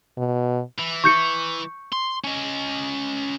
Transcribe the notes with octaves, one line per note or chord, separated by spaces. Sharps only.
B2
E3
C#6 G6 C#7
C6
C#4 D#5